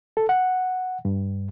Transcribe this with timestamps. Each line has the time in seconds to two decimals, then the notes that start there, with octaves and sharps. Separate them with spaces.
0.17 A4
0.29 F#5
1.05 G2